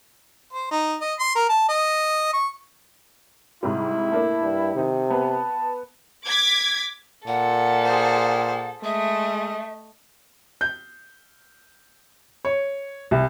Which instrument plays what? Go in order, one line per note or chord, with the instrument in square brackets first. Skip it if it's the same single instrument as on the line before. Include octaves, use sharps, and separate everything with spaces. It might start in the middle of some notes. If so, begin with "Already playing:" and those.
[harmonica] C5
D#4
D#5
C6
A#4
A5
D#5
C#6
[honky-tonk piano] G#2 C3 G3 [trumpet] E4
[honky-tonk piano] A3 A#3 D4
[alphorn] G2
[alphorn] C3 [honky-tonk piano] D#3 D#4
[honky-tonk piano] B3 B4 [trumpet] A5
[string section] D6 G#6 B6
[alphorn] A#2 [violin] A4 [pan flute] F#5
[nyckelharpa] G#4 C5
[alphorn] G#3 [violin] A3 [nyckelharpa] D#5 [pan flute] E5
[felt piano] G6
C#5
C2